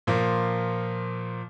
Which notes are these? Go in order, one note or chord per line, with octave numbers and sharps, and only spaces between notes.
A#2 F3 A#3